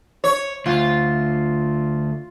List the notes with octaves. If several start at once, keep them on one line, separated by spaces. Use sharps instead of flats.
C#5
D2 F4